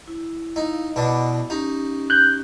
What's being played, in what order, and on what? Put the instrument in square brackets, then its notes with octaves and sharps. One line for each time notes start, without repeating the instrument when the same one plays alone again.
[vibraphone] E4
[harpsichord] D#4 [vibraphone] E4 F5
[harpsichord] B2 D4 [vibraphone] E4 D#5 B5
[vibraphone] C#4 G4 [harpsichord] D#4
[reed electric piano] F#6 G6